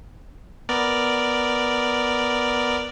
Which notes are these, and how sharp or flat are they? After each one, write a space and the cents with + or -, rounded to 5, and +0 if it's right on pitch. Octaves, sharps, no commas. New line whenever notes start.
B3 +0 A#4 +0 D5 +0